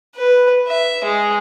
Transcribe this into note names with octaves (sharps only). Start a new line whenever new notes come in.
B4
E5
G#3